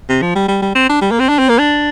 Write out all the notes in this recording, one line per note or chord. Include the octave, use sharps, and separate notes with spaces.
C3
F3
G3
G3
G3
C4
D4
G3
A#3
C4
D4
C4
A#3
D4